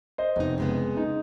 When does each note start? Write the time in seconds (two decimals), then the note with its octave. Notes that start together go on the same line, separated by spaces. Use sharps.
0.18 C5 D#5
0.36 F1 B3 D#4
0.58 C#3 G#3 B3
0.97 D#4